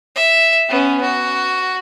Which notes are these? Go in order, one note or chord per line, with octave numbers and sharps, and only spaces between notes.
E5
B3 C#4
F#4